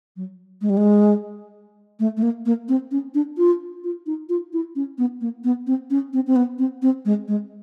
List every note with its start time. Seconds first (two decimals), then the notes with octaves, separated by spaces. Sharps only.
0.17 F#3
0.62 G#3
0.70 G3
0.77 G#3
2.00 A3
2.17 A3
2.23 A#3
2.46 A#3
2.69 C4
2.91 C#4
3.14 D4
3.38 F4
3.84 F4
4.06 D#4
4.29 F4
4.53 E4
4.76 C#4
4.98 B3
5.21 A#3
5.44 B3
5.67 C4
5.90 C#4
6.13 C4
6.27 C4
6.36 B3
6.59 C4
6.82 C4
7.05 G#3
7.28 G#3